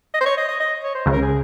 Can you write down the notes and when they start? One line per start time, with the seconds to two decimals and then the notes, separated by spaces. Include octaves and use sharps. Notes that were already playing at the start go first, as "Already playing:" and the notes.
0.14 D#5
0.21 C5
0.26 C#5
0.37 D#5
0.48 D#5
0.60 D#5
0.84 C#5
0.95 C5
1.06 C#2 C#3
1.12 A#4
1.22 G#4